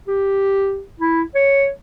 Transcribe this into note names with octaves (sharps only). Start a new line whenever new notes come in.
G4
E4
C#5